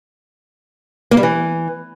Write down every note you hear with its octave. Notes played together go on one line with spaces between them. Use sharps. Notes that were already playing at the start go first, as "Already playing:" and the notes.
A#3
G3
E3